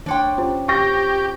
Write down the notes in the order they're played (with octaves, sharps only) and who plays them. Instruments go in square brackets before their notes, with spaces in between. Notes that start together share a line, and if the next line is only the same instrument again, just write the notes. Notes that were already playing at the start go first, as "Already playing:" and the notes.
[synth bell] D#3 C6 [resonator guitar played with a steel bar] D4 C#5 G5
[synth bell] C#4 F4 C5
[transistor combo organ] G4 [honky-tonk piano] C#6 A#6